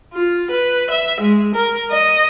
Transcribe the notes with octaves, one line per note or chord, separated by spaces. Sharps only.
F4
B4
E5
G#3
A#4
D#5